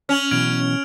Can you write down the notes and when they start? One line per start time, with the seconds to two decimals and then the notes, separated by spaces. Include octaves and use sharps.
0.09 C#4 F6 F7 F#7
0.31 B2 E3 F#3 F6 G#6 D7